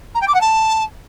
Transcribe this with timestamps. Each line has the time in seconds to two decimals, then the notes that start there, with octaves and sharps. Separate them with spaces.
0.14 A#5
0.21 G5
0.28 D6
0.34 F#5
0.41 A5